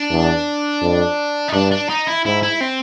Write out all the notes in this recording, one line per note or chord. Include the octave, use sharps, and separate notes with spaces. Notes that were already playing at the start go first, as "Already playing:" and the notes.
Already playing: D4
E2
F2
D#4
G2 D4
D4
D#4
E4
G#2 E4
E4
C4